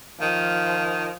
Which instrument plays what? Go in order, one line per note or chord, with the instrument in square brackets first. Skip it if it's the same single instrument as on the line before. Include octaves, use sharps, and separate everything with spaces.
[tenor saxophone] D#3 [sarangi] F3